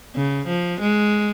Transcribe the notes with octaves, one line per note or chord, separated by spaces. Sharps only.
C#3
F3
G#3